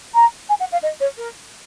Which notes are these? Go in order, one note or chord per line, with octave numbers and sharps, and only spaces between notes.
A#5
G#5
F#5
F5
D#5
C#5
A#4